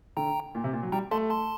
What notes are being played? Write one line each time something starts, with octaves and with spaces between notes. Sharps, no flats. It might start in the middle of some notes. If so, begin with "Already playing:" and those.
D3 G5 A#5
A#2
C3
A#2
F#3
G3 G5 A#5
A3 A5 C6
A5 C6